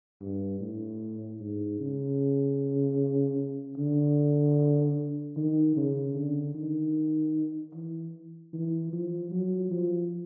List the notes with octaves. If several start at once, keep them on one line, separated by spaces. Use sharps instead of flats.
G2
A2
G#2
C#3
D3
D#3
C#3
D3
D#3
E3
E3
F3
F#3
F3